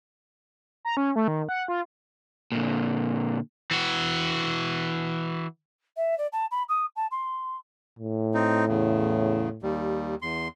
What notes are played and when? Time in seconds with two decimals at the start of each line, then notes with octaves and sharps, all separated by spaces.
0.85 A#5
0.97 C#4
1.16 A3
1.28 D#3
1.49 F#5
1.68 F4
2.52 A#2 D3
3.71 E3 F#4
5.97 E5
6.18 D5
6.33 A5
6.51 B5
6.69 D#6
6.96 A5
7.11 C6
7.99 A2
8.34 C4 D#4
8.68 E2 C#3
9.63 D#2 G3
10.22 E2 C6